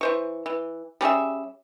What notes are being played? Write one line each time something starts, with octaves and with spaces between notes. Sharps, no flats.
E3 C5 C#6
E3
G3 C#4 G#4 E5